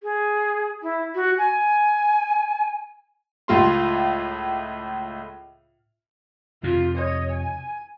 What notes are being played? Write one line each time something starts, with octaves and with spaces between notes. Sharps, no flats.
G#4
E4
F#4
G#5
C#2 A2 F4 C6
F2 C3 F4
C#5 D#5
G#5